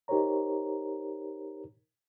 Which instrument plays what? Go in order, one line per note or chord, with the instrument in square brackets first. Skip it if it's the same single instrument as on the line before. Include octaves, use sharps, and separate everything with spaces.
[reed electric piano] D#4 G4 A#4 C5 C#5 A#5